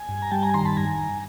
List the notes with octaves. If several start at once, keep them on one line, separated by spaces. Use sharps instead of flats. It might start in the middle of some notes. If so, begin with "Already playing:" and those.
Already playing: G#5
G2
A#5
G3 G5 A5
G#5 A#5
D#3 A#5 C6
A5 B5
G2 G#5 A#5
G2